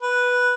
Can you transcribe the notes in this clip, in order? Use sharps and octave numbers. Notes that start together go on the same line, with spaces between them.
B4